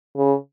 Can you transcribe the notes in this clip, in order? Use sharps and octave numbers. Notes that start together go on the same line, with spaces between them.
C#3